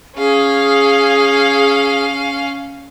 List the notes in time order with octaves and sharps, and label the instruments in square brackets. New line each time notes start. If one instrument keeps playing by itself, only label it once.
[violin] C#4 F5 [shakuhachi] G#4